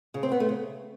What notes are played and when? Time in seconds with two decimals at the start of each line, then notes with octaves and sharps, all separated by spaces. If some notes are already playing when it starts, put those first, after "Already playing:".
0.14 C#3
0.23 C4
0.32 B3
0.40 A3
0.49 C#3